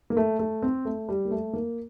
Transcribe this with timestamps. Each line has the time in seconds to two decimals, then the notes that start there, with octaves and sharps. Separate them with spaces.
0.10 A#3
0.17 A3
0.39 A3
0.62 C4
0.85 A3
1.09 G3
1.25 A#3
1.31 A3
1.53 A#3